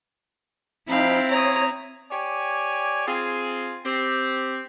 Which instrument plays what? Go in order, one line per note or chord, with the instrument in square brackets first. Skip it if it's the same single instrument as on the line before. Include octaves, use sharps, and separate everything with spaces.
[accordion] F3 D#4 B5 [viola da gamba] C4 E4 [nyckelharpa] F5
[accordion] C#5 [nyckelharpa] A#5 D#6
[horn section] G4 C#5 D5 G#5
C4 F4 G#4
C4 G4